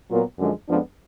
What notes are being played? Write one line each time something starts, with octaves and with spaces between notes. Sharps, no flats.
A#2 F#3 B3 F4 A#4
F#2 D3 F3 G#3
F2 F3 G#3 B3 D4